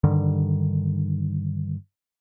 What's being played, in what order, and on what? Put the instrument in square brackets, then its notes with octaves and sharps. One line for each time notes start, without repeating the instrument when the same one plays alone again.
[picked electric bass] G2 D3 D#3 G3